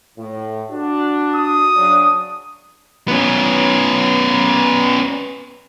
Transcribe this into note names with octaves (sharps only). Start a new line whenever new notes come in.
A2
D4 F#4
D#6
C#3 F#3 D4
B3 C#4